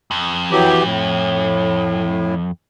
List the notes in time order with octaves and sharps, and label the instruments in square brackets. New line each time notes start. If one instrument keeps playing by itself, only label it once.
[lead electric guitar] F2
[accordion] E3 F#3 G4
A2